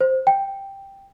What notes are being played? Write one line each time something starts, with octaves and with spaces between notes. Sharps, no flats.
C5
G5